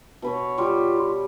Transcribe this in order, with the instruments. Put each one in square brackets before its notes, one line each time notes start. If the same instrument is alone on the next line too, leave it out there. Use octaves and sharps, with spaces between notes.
[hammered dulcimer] B2 B4 C#5
[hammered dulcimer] G3 [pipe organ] F4